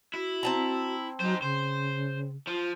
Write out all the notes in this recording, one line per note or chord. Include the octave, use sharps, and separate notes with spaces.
E4 F#4
C4 A5 A#5
F#3 D#4 C5
C#3 C5
F3 F4